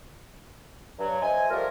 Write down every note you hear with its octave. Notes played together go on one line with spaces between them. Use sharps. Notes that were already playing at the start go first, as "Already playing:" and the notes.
G2 F#3
C5 D#5 E5 G#5
F3 G3 A3 F4 A#4